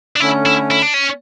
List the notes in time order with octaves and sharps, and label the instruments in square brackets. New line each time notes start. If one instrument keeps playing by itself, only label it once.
[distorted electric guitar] D4
[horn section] D3 A3 C#4 [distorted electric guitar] E4
[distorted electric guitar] E4
E4
D4
C#4